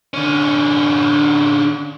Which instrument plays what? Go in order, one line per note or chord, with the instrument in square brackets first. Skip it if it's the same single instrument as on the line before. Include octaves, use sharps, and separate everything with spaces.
[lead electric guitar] D3 C#4